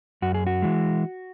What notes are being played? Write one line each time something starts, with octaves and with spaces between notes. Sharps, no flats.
F#2 F#4
G#4
F#4
E3 G#3